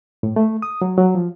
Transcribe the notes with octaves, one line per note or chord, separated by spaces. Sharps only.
A2
A3
D#6
F#3
F#3
F3